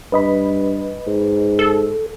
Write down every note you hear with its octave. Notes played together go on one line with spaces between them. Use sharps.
G2 B4 D#5 B5
G#2
A4